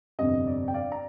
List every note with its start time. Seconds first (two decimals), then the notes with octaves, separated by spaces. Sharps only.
0.19 G1 F2 C3 D#5
0.47 D5
0.68 G5
0.74 D5 F5
0.92 A#5